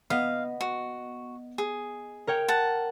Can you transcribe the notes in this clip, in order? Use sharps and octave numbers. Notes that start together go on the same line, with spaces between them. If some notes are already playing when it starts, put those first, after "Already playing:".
B3 D#5 F5
F#4
G#4
A#4 C#5 G5
F#5 A5